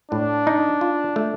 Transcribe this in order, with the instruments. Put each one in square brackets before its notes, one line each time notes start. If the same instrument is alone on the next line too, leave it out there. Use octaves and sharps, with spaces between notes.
[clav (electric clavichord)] A2 [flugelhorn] D4
[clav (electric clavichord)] D#4
F4
A3